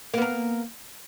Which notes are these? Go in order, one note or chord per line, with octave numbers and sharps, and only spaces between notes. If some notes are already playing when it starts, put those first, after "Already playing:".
A#3 B3 A#4